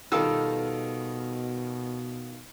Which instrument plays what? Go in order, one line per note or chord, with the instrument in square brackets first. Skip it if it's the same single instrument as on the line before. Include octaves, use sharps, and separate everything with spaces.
[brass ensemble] B2 [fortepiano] D#3 F4 E6 [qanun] G3 A4